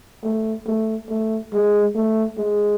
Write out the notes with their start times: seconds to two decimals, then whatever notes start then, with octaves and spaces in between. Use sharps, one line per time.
0.24 A3
0.66 A3
1.09 A3
1.53 G#3
1.95 A3
2.38 G#3